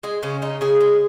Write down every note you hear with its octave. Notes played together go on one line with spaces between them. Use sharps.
G#3 G#4
C#3 C#4
G#3 D#4
C#3 G#4
G#3